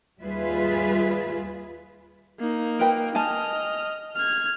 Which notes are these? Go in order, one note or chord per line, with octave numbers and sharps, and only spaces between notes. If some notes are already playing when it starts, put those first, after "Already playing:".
D#2 G3 F4 G#4 B4 E5
A#3 D#4
A#4 B4 G5
D#5 G#5 A5 F6
F6 G#6